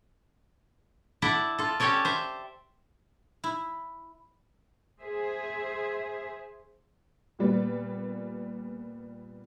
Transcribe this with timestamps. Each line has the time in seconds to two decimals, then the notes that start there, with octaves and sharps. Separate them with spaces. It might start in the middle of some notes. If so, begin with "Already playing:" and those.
1.22 E4 A4 D5 E5 F#5
1.59 F4 A4
1.80 C#4 G4 A4 C#5 D5
2.05 C5 E5
3.44 E4
5.01 G#4 C5 E5
7.39 A#2 G3 B3